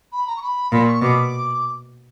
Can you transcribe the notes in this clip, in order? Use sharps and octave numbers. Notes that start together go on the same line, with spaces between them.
B5
A#5
C#6
B5
A#2 B5
C#6
B2 D6